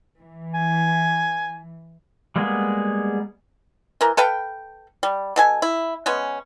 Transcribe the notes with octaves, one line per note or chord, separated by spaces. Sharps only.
E3
G#5
G3 G#3 A#3 B3 G#4
E3 A#4
A4 B4 F5 G5
G3
B2 A4 G#5
E4
G#3 B3 C#4